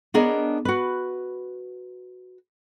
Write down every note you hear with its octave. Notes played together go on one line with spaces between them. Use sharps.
B3 D4 G#4 A#4 C#5 D#5
F#4 B4